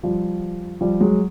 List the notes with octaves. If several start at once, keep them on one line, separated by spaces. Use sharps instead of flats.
F3 G3
F3 G3
F#3 G#3